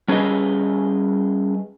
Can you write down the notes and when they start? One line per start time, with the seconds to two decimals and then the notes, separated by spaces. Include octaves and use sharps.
0.08 G3 C#4 G#4 B4 D#5